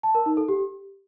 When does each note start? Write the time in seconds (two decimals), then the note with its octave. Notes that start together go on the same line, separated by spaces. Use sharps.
0.03 A5
0.15 A#4
0.26 D#4
0.37 A4
0.48 G4